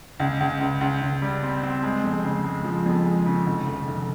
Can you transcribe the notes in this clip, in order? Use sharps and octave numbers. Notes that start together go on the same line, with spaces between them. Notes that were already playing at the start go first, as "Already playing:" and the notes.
C#2
C#2
C#2
C#2
C#2
G3
C4
C4
G#3
F2
C#3
G#3
F3
F2
G#3
C#3
F1
F1
F1